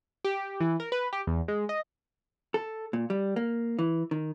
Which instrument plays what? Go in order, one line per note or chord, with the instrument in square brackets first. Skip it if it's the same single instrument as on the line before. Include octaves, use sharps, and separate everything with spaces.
[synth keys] G4
E3
A#4
B4
G4
E2
G#3
D#5
[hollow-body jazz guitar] A4
A#2
G3
A#3
E3
D#3